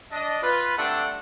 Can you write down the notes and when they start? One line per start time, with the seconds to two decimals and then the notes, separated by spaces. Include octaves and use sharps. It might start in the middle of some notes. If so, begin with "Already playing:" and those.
0.12 D4 D#5
0.42 F4 B4
0.77 G3 A3 C4 D4 A4 F#5